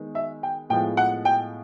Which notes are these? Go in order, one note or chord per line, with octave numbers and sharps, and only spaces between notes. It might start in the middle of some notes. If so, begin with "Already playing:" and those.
Already playing: D#3 G#3 B3
E5
G5
A2 F3 G#3 B3 G5
F#5
G5